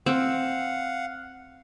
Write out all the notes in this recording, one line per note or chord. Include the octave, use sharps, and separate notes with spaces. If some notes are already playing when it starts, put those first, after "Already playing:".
C4 F5 F#5